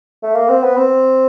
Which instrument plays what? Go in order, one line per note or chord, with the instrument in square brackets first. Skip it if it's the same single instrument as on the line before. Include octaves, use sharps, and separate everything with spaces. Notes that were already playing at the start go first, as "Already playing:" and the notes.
[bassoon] A3
A#3
C4
B3
C4